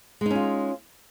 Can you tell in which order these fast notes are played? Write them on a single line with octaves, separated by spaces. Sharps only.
G#3 D#4 C#4 F4